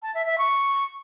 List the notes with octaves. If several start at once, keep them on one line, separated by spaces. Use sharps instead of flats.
A5
E5
E5
C#6